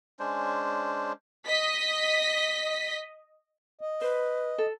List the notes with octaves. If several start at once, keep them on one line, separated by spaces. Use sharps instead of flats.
G#3 C#4 D4 C5
D#5 B6
D#5
B4 C5
A4